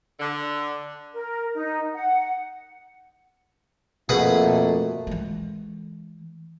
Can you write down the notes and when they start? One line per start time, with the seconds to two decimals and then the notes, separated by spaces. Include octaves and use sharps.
0.20 D3
1.13 A#4
1.55 D#4
1.94 F#5
4.09 F2 B2 A3 A#3 G#4 B4 F#5
5.07 E3 G#3